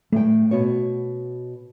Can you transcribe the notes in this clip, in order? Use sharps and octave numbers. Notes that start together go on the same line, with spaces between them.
A2 A3 G5
B2 F#4 C#5